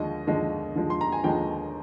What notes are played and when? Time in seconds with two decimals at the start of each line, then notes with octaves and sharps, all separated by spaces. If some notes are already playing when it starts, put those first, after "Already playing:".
Already playing: D#2 D3 F3 G#3 D#5
0.27 D#2 D3 F3 G#3
0.76 D#2 D3 F3 G#3
0.90 C6
1.01 A#5
1.12 G#5
1.23 D#2 D3 F3 G#3 G5